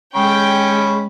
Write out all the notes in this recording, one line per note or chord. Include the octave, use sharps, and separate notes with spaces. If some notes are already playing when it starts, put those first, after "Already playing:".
G#3 C#4 G5 B5 C#6